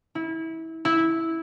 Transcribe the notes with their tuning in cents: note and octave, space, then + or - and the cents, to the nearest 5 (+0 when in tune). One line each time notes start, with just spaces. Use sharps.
E4 -25
E4 -10